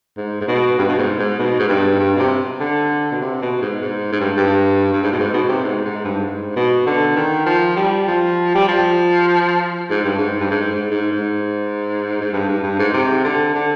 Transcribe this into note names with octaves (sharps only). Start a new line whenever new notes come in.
G#2
G#2
B2
G2
B2
G#2
G#2
B2
G#2
G2
G2
B2
C3
D3
B2
C3
B2
G#2
G#2
G#2
G2
G2
G2
G#2
B2
G#2
B2
C3
G#2
G#2
G2
G#2
B2
D3
D#3
F3
G3
F3
G3
F3
G#2
G2
G#2
G2
G#2
G#2
G#2
G#2
G#2
G2
G2
G2
G#2
C3
D3
D3